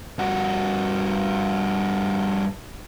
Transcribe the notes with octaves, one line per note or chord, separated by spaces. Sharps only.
G2 F#4